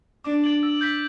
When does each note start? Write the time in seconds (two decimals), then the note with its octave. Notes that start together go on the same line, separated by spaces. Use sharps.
0.24 D4 D6
0.44 A6 D7 F#7
0.63 E6
0.81 G6 B6 F#7